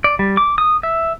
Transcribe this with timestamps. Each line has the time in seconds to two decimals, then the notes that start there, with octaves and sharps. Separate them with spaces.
0.04 D5
0.19 G3
0.37 D6
0.58 D#6
0.83 E5